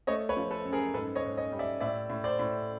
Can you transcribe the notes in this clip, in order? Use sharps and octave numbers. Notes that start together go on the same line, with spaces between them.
A3 C#5 D#5
B4 C#5
F3
A4 B4
F#2
G#4 A#4
G#2 A4 B4
C#5 D#5
G#2
C#5 D#5
G3
D5 E5
A2 D5 E5
A2
C5 D5
A2